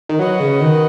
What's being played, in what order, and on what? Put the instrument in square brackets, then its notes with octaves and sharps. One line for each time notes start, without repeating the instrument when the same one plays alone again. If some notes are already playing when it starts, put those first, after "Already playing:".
[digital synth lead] D#3
[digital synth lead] F#3 [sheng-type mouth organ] F#4 B4 D#5 F#5
[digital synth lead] C#3
D#3